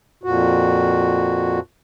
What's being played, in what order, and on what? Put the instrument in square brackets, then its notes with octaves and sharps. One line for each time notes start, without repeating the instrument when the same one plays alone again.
[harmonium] F2 A#2 F#4